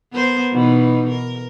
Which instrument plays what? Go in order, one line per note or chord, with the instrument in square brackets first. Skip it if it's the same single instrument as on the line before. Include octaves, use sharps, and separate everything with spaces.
[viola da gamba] B3 A#4 C5
B2 E3 D#4
A#4